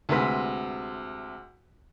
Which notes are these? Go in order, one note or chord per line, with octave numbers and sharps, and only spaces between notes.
D2 C3 G#3 B4 C6 B6